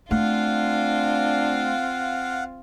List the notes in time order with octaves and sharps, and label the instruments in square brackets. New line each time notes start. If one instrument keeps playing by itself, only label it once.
[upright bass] A3 [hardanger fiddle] C4 F4 [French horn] D4 [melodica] F5 F#5